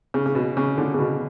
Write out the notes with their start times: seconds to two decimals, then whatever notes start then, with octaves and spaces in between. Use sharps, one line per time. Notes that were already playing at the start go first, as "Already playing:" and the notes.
0.14 C#3
0.26 C#3
0.35 B2
0.57 C#3
0.78 D3
0.94 C#3
0.99 B2